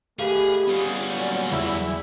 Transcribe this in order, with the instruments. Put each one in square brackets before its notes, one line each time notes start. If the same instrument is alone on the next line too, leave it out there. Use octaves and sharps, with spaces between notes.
[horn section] D#3 A3 B4 [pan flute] G4 [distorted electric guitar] G#4 [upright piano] F5
[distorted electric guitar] G3 B3 [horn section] C#4 F4 G#4
[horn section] A#2 F#3 C#4 [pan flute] D5
[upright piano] E2 E6 [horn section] E4